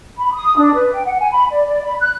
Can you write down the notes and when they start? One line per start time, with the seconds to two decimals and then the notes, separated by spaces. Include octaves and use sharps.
0.18 B5
0.34 D#6
0.58 D4
0.75 B4
0.93 G5
1.06 F#5
1.20 G#5
1.32 B5
1.51 D5
1.66 D5
1.84 B5
2.00 F#6